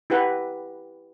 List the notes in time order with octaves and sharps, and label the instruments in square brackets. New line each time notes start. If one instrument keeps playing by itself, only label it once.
[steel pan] E4 G4 B4 F#5 A#5